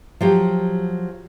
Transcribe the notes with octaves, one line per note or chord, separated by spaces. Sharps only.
F3 F#3 G4